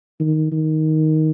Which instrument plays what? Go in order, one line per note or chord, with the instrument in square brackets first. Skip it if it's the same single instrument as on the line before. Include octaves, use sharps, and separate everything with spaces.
[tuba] D#3
D#3